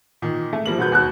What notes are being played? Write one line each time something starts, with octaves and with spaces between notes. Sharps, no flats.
A#2 D#3
A3
F3 G3 A#3 F#7
E1 F#4 B4 G6
D#2 F#4 F#6